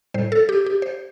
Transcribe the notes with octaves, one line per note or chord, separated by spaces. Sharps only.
A2 G3 C5
A4
G4
G4
C5